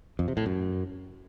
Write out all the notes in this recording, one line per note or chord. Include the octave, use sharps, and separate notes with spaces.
F2
C3
A2
F#2